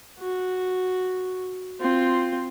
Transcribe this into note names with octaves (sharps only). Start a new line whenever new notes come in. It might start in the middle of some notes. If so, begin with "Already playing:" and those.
F#4
C4 F4